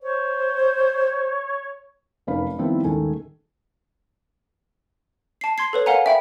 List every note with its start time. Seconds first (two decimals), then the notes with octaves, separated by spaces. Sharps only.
0.02 C5 C#5
2.27 F1 F#2 D#4 B4 F5 B5
2.58 D#3 F3 G3 B3 C4 E4
2.84 D#1 G#2 D#3 A3 C#4 G#5
5.41 A5 C7
5.58 C6 G#6 C7
5.73 A4 B4 C#5
5.86 A#4 C#5 F5 F#5 G#5 A#5
6.06 E5 G5 B5